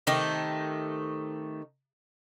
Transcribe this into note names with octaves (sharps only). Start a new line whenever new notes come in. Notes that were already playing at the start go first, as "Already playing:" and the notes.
C3 D#3 A3 D#4